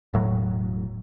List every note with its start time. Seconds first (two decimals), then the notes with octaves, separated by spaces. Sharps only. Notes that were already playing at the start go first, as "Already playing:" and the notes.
0.13 E1 A2 F#3